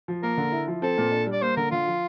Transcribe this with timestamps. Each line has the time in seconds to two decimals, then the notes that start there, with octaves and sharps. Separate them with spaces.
0.08 F3
0.23 A#3 A#4
0.37 D3
0.52 E4
0.68 F3
0.82 C4 A4
0.98 A#2
1.12 D4
1.27 G3
1.32 D5
1.42 A#3 C5
1.57 D3 A#4
1.71 D3 F4
1.87 F3